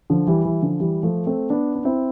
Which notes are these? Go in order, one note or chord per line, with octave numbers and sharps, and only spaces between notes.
D3 F3
E3 G3
E3 G3
D3 F3
E3 G3
F3 A3
A3 C4
B3 D4
D4
C4 E4